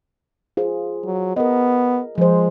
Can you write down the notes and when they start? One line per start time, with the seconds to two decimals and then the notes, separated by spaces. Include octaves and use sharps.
0.57 F4 G#4 C5
1.05 F#3
1.37 B3 A#4 D#5
2.18 F3 G#3 C5